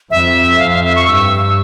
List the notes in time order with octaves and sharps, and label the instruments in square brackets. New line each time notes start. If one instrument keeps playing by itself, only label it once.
[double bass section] F2 [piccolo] E5
[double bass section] F2 [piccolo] F5
[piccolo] F5
E5
C#6
[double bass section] G2 [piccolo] E6